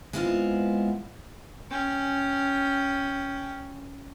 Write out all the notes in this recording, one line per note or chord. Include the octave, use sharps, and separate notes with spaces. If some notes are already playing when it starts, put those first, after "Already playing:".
G#3 B3 C4 E4 F4
C#4 G5